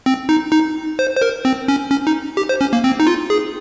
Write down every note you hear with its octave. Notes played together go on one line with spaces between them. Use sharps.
C4
D#4
D#4
C5
C5
A#4
C4
C#4
C#4
D#4
G4
C5
C#4
A#3
C4
D#4
F4
G#4